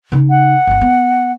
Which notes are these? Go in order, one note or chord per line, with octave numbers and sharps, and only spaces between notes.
C#3 D#4
F#5
G1 E4
B3